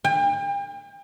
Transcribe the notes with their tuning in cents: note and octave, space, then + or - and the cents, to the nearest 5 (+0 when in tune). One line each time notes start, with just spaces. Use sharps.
G5 +40